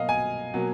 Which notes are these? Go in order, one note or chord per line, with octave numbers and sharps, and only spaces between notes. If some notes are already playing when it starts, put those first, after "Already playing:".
Already playing: B2 F#3 A#3 D#5 F5
G#5
B2 F#3 A#3